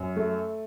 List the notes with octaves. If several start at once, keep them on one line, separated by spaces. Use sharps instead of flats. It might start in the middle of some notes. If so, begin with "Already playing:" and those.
Already playing: F#2
A3